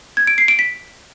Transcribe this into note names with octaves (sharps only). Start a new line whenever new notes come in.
G#6
D7
C7
D7
B6